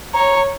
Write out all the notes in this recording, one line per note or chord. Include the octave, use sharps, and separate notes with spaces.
C#5 A#5